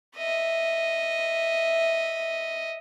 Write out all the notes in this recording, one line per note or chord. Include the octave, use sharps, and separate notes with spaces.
D#5 E5